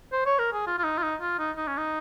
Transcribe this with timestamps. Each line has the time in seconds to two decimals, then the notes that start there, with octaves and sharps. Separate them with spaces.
0.12 C5
0.26 C#5
0.39 A#4
0.53 G#4
0.66 F4
0.78 F4
0.84 D#4
0.98 F4
1.03 D#4
1.21 F4
1.39 D#4
1.56 D#4
1.67 C#4
1.77 D#4